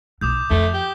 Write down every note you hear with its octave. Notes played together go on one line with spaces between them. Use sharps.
B1 D6 D#6 G6
F2 A3
G4